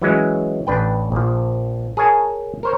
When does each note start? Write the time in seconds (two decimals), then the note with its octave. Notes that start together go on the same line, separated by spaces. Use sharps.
0.02 E3 F#3 G#3 C#4
0.67 A1 D4 B4 G5
1.12 A#1 F3
1.97 G#4 A#4 C#5 G#5 A5
2.63 A#4 C5 C#5